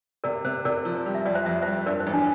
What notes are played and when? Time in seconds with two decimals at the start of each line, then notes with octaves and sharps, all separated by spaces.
0.24 C3 A#4 D5
0.45 C3 C5
0.65 C3 A#4 D5
0.85 F3
1.06 G3
1.15 E5
1.25 F2 D5
1.35 C5 E5
1.46 F2 E5
1.62 G3 C5 E5
1.86 G2 A#4 D5
2.00 C5
2.07 A1
2.13 D4